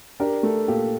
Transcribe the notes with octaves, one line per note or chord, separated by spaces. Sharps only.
D4 G4 A#4
A3 A4
A#2 G4